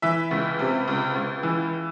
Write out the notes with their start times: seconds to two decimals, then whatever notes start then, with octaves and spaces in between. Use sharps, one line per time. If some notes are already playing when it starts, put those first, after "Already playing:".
0.02 E3 E5
0.31 C#2
0.59 C3
0.88 C#2
1.15 C#2
1.43 E3